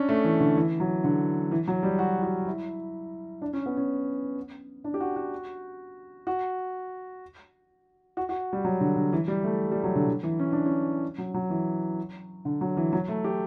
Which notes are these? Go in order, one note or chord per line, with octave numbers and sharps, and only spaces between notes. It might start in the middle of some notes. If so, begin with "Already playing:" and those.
Already playing: C#4 D4
A3
E3
D3
E3
F#3
D3
E3
F#3
G3
F#4
F#4
E4
D4
C#4
B3
C#4
D4
G4
F#4
F#4
F#4
F#4
F#4
G3
F#3
D3
D3
E3
G3
A3
G3
F#3
D3
D3
E3
C#4
D4
C#4
F#3
F#3
E3
D3
F#3
E3
F#3
A3
G4